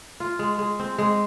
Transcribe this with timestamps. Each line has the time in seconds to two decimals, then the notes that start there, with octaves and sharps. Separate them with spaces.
0.20 F4
0.39 G#3
0.59 G#3
0.79 C4
0.98 G#3